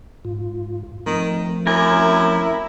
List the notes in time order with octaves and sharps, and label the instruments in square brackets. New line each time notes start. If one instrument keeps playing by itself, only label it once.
[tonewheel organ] G#2 F4
[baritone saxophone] D#3 [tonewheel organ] F3 A3 C4
[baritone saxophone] F#2 [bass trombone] E4 [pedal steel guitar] A#4 G#5